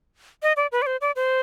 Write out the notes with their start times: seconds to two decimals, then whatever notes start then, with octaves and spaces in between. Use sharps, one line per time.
0.43 D#5
0.57 D5
0.72 B4
0.82 D5
0.86 C5
1.01 D5
1.16 C5